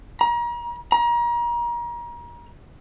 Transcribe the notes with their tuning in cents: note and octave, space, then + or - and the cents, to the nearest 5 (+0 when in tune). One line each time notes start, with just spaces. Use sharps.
A#5 +35
A#5 +35